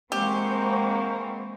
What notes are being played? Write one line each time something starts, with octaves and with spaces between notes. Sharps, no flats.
E3 G#3 A#3 C4 G4 C5 F#5 C#6